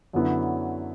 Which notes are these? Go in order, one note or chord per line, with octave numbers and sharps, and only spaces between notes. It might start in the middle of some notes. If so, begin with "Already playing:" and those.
F#2 D3 F#3 B3 E4